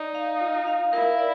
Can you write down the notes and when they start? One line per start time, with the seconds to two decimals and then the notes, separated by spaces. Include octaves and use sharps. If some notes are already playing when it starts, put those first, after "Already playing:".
Already playing: D#4 D5
0.15 F5
0.40 F4
0.67 F5
0.92 E4 A#4
1.18 D5